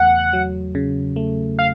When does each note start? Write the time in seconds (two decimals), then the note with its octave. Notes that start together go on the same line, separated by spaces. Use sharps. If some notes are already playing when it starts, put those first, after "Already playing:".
Already playing: E2 C#3 A3 F#5
0.33 F#3
0.75 C#3
1.16 A3
1.59 F5